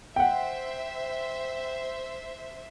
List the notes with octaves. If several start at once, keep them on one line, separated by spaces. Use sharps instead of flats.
C5 E5 F#5 G5